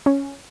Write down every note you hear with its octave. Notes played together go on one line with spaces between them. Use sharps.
C#4